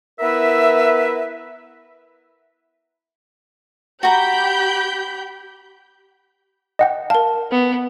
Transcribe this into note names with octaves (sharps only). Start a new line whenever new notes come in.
B3 E4 A#4 B4 E5
F#4 G4 A#5 B5 G6
D#5 F#5 G5
A#4 F5 A5
B3